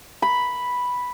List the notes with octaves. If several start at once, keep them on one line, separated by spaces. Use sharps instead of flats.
B5